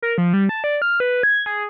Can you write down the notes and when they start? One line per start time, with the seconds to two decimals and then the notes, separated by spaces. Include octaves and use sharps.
0.02 A#4
0.18 F3
0.33 G3
0.49 A5
0.64 D5
0.82 F6
1.00 B4
1.23 G#6
1.46 G#4